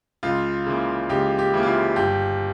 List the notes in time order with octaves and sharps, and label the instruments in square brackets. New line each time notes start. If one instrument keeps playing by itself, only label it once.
[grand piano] C#2 F4
C#3 E3 A#3
C#2 G4
G4
C#3 E3 A#3
F4
E4
G1 G4